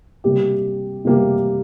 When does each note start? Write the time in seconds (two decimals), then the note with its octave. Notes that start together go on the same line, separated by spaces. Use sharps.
0.24 C3 G3 A#3 G4
1.05 C3 G3 A#3 G4